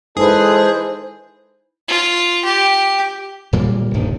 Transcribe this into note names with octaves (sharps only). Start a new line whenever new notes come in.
G#3 D#4 E4 G#4 A4 B4 C5
F4
G4
D1 A#2 G3 A#3
D#1 C2 G2 D#3